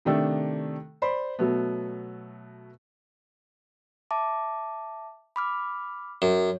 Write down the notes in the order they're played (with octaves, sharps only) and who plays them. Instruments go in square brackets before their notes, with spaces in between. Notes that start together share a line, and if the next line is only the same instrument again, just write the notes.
[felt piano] C3 D#3 A3 D4 A4
C5 D5 B5 C6
B2 F#3 A3 B3
[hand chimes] E5 A5 D6
B5 D6 F6
[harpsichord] F#2 [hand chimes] C#5